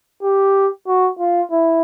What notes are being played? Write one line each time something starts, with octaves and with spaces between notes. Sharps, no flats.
G4
F#4
F4
E4